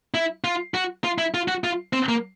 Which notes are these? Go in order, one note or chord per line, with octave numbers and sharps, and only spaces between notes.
E4
F4
F#4
F4
E4
F4
F#4
F4
C4
A#3